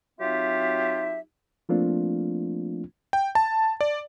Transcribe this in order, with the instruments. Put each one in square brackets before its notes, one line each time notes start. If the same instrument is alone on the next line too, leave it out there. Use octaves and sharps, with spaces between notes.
[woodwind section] F#3 C4 D#4 F4 G4 E5
[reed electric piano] F3 A3 A#3 C4 D4 F4
[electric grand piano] G5
A5
D5